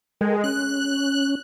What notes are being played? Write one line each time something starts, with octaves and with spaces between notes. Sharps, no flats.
G#3 A4 A#4 G5
C#4 F#6